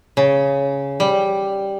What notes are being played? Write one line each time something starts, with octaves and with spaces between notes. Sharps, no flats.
C#3
G3